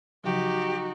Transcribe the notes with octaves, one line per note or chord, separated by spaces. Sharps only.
C#3 F3 F#3 D#4 F#4 G4